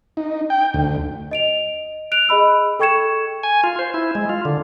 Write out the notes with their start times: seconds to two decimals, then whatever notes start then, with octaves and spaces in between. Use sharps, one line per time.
0.17 D#4
0.50 G5
0.74 D2
1.31 D#5 D7 F7
2.12 F#6 D7 F7
2.29 G#4 D#5 B5 E6
2.79 A4 G5 C#6 G#6 C#7 E7
3.43 G#5
3.64 F4
3.79 C5
3.94 E4
4.15 G#3
4.29 F4
4.45 D3